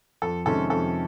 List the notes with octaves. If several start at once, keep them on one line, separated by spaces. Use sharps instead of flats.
F2 A4
C3 D#3 G#3 C#4 A4
F2 A4